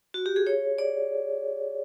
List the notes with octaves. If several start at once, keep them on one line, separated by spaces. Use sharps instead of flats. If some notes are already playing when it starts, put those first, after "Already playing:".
F#4
G4
G#4
C#5
D5